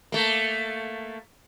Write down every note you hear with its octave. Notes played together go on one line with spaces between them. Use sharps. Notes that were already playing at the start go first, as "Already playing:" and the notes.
A3 A#3